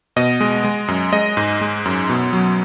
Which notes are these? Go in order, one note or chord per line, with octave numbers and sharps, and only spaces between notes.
B2 D#5
G#3
G#3
F#2
G#3 D#5
G#2
G#3
F#2
B2
F#3